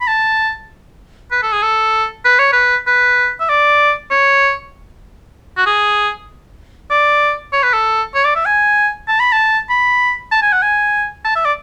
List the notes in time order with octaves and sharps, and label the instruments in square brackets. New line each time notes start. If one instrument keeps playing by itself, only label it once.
[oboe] B5
A5
B4
A4
G#4
A4
B4
C#5
B4
B4
E5
D5
C#5
F#4
G#4
D5
C#5
B4
A4
C#5
D5
E5
G#5
A5
B5
A5
B5
A5
G#5
F#5
G#5
A5
E5
D5